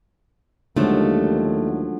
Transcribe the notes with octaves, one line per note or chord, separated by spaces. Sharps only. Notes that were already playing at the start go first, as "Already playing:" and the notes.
D#2 D3 F3 F#3 G#3 A3